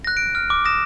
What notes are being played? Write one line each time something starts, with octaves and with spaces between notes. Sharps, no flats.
F#6 A#6
D7
F6
D6
D6 D#6 A#6 E7